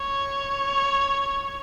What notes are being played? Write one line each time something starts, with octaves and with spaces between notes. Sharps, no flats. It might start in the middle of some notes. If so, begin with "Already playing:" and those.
Already playing: C#5